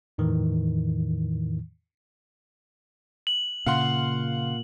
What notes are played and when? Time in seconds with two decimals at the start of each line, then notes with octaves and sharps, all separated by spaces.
0.18 E2 A2 D#3 E3
3.27 F#7
3.66 A#2 C#3 F5 F#5 C6